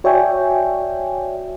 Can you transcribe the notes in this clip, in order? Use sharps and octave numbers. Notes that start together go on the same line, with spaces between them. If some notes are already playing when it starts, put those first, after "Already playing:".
F#4 C#5 D5 E5 G5 G#5